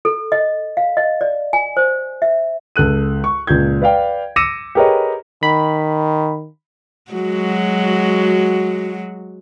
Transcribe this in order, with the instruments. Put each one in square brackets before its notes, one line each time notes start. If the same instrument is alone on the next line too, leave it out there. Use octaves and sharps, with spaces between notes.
[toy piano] A4
D#5
F5
D#5
D5
G#5
C5
E5
[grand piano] C#2 A4 F#6 D#7
C#6
C#2 A#2 G6 G#6
B4 D5 F5 G5
D6 E6 A#6 C#7 D#7 E7
G4 G#4 A#4 B4 C#5 D#5
[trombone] D#3 [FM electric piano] B5
[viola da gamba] F#3 G#3 F#4